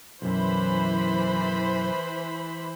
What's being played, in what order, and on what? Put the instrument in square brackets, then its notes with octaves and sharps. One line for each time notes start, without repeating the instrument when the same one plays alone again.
[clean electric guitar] B1 F#2 [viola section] E3 C5 B5